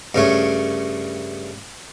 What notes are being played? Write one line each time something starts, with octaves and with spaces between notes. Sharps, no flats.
G2 C#3 A3 C#5